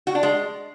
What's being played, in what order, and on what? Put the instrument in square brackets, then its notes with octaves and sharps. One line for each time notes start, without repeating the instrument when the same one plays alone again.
[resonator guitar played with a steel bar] F#4
D4
G#3